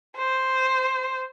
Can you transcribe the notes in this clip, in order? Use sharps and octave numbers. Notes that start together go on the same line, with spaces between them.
C5